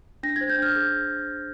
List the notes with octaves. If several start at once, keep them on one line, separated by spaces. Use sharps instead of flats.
D4 A#6
C5 G#6
G6
D4 F6
G#4 G6